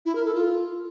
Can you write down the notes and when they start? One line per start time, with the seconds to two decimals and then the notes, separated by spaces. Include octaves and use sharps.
0.06 E4
0.15 A#4
0.25 A4
0.35 F4